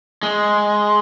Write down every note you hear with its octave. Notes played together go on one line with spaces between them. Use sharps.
G#3